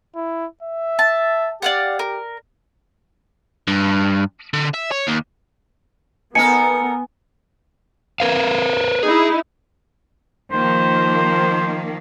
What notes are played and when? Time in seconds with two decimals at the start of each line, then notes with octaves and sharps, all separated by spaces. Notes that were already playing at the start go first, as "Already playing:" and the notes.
0.15 E4
0.63 E5
0.99 A5
1.62 G4 D5 F5 F#5
1.99 A#4
3.68 G2
4.54 D3
4.74 E5
4.91 C#5
5.07 D#2
6.35 B3 D#4 A4 A#4 G#5 C#7
8.20 A#4 B4 F5
9.03 D#4 E4 G#4
10.52 D#3 F3 A#3 C5